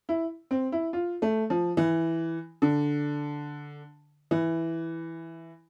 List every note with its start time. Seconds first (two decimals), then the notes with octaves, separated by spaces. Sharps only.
0.09 E4
0.51 C4
0.72 E4
0.93 F4
1.22 A3
1.50 F3
1.77 E3
2.62 D3
4.31 E3